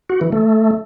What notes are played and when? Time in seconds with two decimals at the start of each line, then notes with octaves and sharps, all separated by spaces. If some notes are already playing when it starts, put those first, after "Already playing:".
0.10 F#4
0.21 E3
0.32 A3